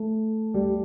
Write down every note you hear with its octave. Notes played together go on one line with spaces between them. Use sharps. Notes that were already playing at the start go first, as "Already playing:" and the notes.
Already playing: A3
G3